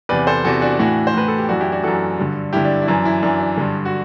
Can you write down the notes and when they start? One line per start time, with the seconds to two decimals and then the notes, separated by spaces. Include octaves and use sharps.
0.09 E2 C3 E3 B4 D5
0.27 A4 C5
0.44 E2 C3 E3 F#4 A4
0.62 D4 F#4
0.79 A2 E3 D4 F#4
1.07 C5
1.14 A2 E3 B4
1.28 A4
1.38 G4
1.48 F#2 E3 D4 F#4
1.60 E4 G4
1.72 D4 F#4
1.83 F#2 E3 F#4 A4
2.18 G2 D3
2.53 G2 D3 E4 G4
2.65 D4
2.82 E4
2.88 F#2 E3 D4
3.05 E4
3.23 F#2 E3 D4
3.40 D4
3.57 G2 D3
3.85 F#4